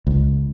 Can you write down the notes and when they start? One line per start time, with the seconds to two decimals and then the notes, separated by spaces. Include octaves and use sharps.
0.07 C#2